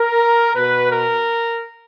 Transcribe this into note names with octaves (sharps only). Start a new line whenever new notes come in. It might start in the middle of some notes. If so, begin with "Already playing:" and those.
Already playing: A#4
B2 B4
A#4